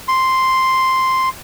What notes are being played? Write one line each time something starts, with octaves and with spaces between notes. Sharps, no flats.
C6